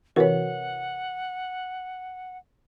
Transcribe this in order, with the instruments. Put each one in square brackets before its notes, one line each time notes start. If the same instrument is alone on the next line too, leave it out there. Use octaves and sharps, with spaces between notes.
[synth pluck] C3 E3 F#4 [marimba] A#4 B4 C#5 [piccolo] F#5